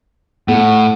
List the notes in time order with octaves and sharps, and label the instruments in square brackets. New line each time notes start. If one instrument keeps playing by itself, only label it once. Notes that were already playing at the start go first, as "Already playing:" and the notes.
[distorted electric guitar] A2 [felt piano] A3 [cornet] F#5